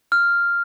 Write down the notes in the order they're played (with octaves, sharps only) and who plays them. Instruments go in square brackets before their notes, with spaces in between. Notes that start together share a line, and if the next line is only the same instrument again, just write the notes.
[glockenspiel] F6